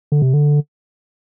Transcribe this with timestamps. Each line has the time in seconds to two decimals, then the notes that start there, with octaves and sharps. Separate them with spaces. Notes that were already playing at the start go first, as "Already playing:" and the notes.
0.12 D3
0.22 C3
0.34 D3